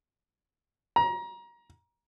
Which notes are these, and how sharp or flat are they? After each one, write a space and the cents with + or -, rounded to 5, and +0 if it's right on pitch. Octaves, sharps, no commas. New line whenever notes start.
A#5 +25